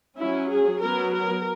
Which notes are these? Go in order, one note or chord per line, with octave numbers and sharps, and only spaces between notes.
F#3 C#4 E4
G#4
F#3 B3 A#4
A#4